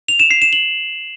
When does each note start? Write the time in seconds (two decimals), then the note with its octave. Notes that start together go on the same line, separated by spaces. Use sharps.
0.08 F7
0.20 E7
0.31 C7
0.42 E7
0.53 F#7